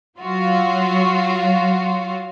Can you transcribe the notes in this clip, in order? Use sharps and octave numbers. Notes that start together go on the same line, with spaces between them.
F#3 F4 F#4